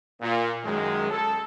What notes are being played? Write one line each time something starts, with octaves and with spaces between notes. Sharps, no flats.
A#2
F#2 D#3 G#3
A4